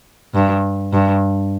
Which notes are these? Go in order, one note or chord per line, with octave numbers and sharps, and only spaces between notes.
G2
G2